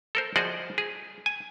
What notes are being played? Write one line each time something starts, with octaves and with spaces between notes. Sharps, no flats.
A4 A#4 C5
F3 F#4 G#4 C5 D5 D#5
G#4
G#5